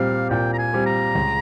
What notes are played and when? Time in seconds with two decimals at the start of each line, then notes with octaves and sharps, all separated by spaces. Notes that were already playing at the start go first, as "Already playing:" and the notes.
Already playing: A#2 G3 C4 F5
0.30 A#2 G5
0.53 A#5
0.59 G#5
0.73 G3 C4
0.86 A#5
1.15 C#2